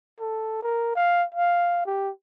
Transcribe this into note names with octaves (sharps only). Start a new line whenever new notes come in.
A4
A#4
F5
F5
G4